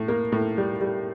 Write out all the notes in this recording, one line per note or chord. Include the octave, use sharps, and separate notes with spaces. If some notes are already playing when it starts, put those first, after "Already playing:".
Already playing: A2
A#3
A2
G3
G3